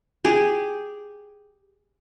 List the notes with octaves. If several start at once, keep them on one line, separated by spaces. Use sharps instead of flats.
G4 G#4